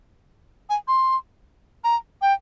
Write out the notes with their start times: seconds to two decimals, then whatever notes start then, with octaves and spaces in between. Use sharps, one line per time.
0.70 G#5
0.88 C6
1.84 A#5
2.22 G5